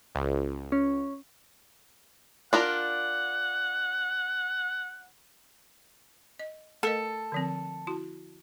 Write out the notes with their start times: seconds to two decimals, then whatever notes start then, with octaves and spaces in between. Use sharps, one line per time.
0.15 C#2
0.72 C#4
2.53 D4 F4 A#4 F#5
6.39 D#5
6.83 A3 A4 A#4 D#5
7.32 D3 F3 C4
7.87 E4 F#4